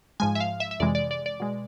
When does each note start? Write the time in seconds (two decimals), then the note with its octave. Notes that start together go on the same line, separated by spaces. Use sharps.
0.20 G#2 F3 G#3 G#5
0.35 E5
0.40 F5
0.60 E5
0.71 E5
0.80 F2 C3 E3 G#3 D5
0.95 D5
1.11 D5
1.26 D5
1.40 B2 G#3